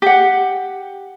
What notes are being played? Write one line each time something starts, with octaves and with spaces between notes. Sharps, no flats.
G4 F#5